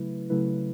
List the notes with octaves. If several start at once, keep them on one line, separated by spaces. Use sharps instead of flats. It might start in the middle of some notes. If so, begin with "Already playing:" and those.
Already playing: C#3 F#3 A3 E4 B4
C#3 F#3 A3 E4 B4